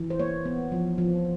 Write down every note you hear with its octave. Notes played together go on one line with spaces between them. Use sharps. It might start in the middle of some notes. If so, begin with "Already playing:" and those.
Already playing: E3
C5
A#3 C#5
B3
F3
F3